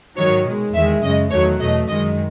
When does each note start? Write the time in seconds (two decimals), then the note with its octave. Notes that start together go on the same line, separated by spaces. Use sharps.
0.17 G#2 D#3 F#3 C#5
0.45 B2 G#3
0.74 E2 D#3 G#3 E5
1.03 F#2 C#3 G#3 D#5
1.32 E2 D#3 F#3 A3 C#5
1.61 E2 B2 A3 D#5
1.89 F#2 D#3 G#3 D#5